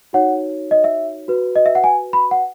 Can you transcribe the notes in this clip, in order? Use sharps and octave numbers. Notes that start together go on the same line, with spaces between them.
D#4 F#4 C#5 F#5
D#5
E5
F#4 B4
D#5
E5
F#5
G#5
B5
F#5